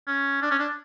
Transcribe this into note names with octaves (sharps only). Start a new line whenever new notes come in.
C#4
D4
C#4
D4